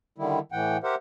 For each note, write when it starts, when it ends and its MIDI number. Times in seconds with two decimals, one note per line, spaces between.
0.18 0.39 50
0.18 0.39 51
0.18 0.39 55
0.18 0.39 64
0.52 0.77 45
0.52 0.77 52
0.52 0.77 78
0.52 0.77 79
0.84 0.95 67
0.84 0.95 70
0.84 0.95 72
0.84 0.95 76
0.84 0.95 78